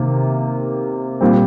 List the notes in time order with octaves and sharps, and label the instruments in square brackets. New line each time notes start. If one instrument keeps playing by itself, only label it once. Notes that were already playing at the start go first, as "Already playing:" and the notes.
Already playing: [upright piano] C3 D#3 A#3
A#2 G3 C4